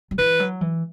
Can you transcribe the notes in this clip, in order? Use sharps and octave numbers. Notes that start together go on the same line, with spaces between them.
F#3
E3 B4
F#3
E3